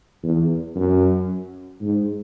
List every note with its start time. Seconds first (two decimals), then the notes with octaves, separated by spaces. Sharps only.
0.23 E2
0.75 F#2
1.81 G#2